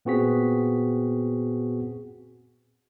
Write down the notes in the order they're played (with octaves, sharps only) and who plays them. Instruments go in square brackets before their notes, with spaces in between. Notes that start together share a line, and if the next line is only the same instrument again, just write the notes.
[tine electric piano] A#2 B3 C4 F#4 G#4 B6